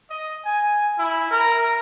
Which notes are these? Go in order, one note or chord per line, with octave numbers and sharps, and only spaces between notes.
D#5
G#5
E4
A#4